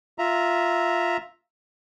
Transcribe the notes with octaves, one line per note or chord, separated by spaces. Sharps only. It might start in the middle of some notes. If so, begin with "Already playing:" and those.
F4 E5 A#5